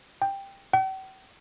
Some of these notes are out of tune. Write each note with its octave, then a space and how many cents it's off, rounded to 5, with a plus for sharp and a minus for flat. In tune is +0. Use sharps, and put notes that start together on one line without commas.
G5 +10
G5 -45